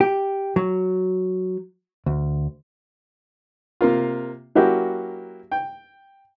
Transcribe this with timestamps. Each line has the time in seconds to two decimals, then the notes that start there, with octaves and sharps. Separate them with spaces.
0.01 G4
0.56 F#3
2.06 D2
3.81 C3 A#3 F4
4.55 F#3 A#3 C#4 E4 F#4 G4
5.52 G5